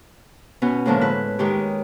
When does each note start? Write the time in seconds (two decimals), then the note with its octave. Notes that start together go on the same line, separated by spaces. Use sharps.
0.62 B2 B3 C#4
0.85 A2 D3 F3 F#3 G#3 A#3
1.01 E4 B4
1.38 D#3 G#3 G4 C#5